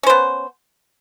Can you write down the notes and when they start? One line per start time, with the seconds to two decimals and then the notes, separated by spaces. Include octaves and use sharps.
0.03 C#4
0.06 C5
0.10 B3